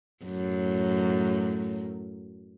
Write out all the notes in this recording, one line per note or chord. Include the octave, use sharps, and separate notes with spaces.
F#2 A2